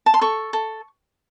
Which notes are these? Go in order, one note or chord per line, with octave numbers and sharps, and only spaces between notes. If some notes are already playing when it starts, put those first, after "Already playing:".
A5
C6
A4 C#6
A4